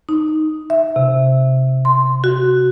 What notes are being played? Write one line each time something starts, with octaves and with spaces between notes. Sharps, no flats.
D#4
E5
C3
C6
F#4